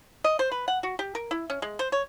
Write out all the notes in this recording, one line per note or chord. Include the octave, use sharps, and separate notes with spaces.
D#5
C5
B4
F#5
F#4
G4
A#4
E4
C#4
G#3
C5
C#5